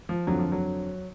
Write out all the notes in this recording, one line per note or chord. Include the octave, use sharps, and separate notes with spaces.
F3
F2 D3 F3 F#3
F3
F#3